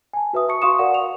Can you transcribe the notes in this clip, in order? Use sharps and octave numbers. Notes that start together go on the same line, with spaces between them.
G#5 A5
F#4 B4 E5 D#6
A5 C#6 C#7
F#4 F5 C6 C#6 D#6 E7
A#4 D5 F5 F#5
F5 F7